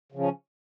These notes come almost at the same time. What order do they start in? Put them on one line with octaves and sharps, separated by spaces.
C#3 F3 C#4